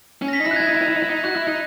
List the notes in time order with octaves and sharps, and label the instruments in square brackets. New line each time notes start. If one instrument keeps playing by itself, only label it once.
[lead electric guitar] C#4
[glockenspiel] A#6
B6
[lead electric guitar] D#4
[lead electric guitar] E4 [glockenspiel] A#6
[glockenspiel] F#6
[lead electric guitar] D#4
[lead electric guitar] E4 [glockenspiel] G#6
[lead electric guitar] D#4
E4
D#4
E4
D#4
E4
D#4
[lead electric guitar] F#4 [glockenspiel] F#6
[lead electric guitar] E4
D#4